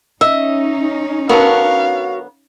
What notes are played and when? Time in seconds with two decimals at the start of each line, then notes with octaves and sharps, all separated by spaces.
0.21 C#4 D#4 D#5 E5
1.29 D3 F#3 B3 F#4 A#4 C#5 F5